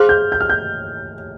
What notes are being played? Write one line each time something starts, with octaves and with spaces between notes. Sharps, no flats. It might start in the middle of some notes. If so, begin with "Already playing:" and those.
Already playing: G#4 C5 F5 C6 F6
G6
G6
F6
G6